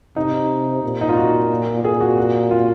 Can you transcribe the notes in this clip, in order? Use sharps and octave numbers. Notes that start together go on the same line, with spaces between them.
C3 D#4
A#2
D#4
F4
F#4
A#2 G#4
F#4
F#4
F4